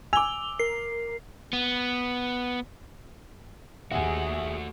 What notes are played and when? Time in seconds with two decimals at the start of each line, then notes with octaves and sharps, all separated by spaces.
0.13 G#5 D6 E6 F7 G7
0.59 A#4 C7
1.53 B3
3.92 D#2 A3 F#4 G#4 E5 F#5 G#5